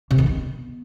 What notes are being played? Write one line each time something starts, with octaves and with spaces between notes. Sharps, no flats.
C3
D#3
B3